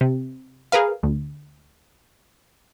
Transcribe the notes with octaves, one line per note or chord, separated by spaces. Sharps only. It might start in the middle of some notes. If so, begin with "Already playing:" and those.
C3
G#4 A#4 B4 F5
D2